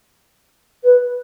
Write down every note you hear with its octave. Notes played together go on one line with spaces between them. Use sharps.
B4